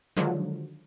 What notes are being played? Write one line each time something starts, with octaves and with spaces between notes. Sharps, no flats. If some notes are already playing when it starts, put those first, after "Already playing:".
D3 D#3 F3 F#3 G#3